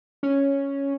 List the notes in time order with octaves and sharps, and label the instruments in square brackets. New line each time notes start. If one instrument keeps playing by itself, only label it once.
[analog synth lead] C#4